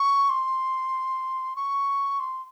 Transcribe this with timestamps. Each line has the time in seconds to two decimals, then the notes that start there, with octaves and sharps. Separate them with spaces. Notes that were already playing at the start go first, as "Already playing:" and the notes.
Already playing: C#6
0.30 C6
1.56 C#6
2.20 C6